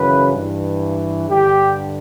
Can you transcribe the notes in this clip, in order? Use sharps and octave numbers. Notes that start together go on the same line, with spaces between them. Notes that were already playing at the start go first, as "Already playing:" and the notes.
Already playing: F#2 C#3 E3 B4
G2 E3
G2 D3 G4